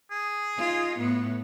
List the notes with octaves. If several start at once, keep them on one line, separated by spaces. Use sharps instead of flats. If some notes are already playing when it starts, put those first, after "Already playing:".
G#4
D#4 F4
A2 B3